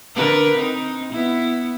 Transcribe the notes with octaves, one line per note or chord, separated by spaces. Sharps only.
D3 A#4 B4
C4 D#4
B3 E4